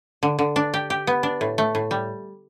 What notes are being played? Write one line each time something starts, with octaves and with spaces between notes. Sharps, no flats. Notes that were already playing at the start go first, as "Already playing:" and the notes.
D3
D3
D4
G4
G4
B3
D4
A2
A3
A2
G3